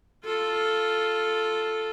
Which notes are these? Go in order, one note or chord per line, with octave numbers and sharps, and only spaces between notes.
F4 A4